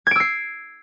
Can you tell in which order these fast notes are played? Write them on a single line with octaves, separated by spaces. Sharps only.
G#6 D7 E6 C7